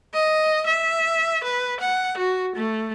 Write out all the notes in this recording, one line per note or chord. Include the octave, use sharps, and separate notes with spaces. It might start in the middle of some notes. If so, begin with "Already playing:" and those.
D#5
E5
B4
F#5
F#4
A3